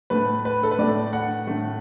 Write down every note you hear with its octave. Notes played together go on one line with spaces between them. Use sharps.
A2 A3 B4
B4
A4
B4
A2 A3 D5
F#5
A2 A3